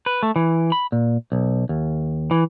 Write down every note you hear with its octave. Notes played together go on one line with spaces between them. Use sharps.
B4
A3
E3
B5
A#2
B1
D#2
E3